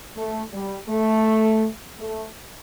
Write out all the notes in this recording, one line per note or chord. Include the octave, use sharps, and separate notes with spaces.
A3
G3
A3
A3